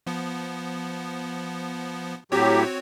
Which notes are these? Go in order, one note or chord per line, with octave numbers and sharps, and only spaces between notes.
F3 B3
A2 F#3 C4 F#4 G4 C#5